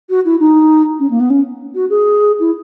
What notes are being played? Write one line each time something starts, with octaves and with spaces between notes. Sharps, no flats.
F#4
E4
D#4
C#4
A#3
B3
C#4
F#4
G#4
E4